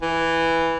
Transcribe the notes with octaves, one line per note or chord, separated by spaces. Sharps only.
E3